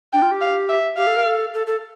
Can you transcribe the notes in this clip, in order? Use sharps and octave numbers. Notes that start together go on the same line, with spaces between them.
D4 G5
F4
G4
F5
E5
G4 F5
A4
A#4
A4
A4
A4